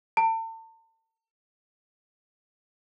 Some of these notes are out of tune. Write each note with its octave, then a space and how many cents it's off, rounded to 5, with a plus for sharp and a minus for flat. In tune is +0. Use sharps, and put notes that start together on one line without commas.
A5 +40